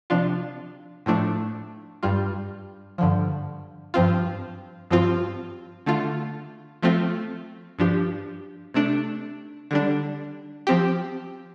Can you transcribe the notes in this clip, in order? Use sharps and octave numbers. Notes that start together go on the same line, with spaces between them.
C3 F3 D4 F4
A2 F3 A3 D4
G2 G3 F4
G2 D3 F3
G2 F3 C4 F4
G2 F3 C4 F4
D3 A3 F4
F3 A3 C4 F4
G2 F3 D4 G4
C3 A3 D4
D3 G3 D4
F3 C4 G4